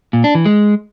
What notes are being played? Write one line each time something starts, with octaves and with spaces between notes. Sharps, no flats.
A#2
D4
E3
G#3